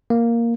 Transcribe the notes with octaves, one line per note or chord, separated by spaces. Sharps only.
A#3